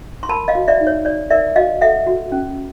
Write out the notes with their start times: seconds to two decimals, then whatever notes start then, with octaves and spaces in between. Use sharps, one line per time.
0.23 C6
0.29 A#4 A5 B5
0.48 D#5 F5
0.55 F#4
0.68 D5 E5
0.80 D#4
0.87 C#5
1.05 C#5 D5
1.30 A#4 D5 E5
1.56 F#4 D#5 F5
1.81 A4 E5 F#5
2.07 F#4
2.32 C#4